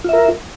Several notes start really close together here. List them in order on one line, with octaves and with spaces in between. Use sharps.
F4 E5 A#4